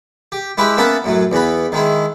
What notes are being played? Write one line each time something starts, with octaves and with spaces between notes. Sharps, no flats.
G4
G#3 E4 G4 B4 E5
A#3 B3 C#4 E5 F#5 A5
F#2 A2 F#3
E2 E3 B3 B5
D#3 G#3 E4